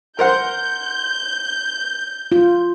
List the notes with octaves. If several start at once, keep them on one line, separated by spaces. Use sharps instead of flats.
A#4 C5 F#5 G6
F4